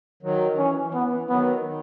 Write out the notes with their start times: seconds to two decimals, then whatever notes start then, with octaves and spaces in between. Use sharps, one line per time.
0.23 D#3 F#3
0.58 E3 C#4
0.82 E3
0.94 B3
1.07 E3
1.29 D#3 F#3 B3
1.65 D#3